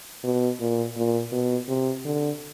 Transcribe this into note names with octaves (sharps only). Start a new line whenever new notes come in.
B2
A#2
A#2
B2
C3
D3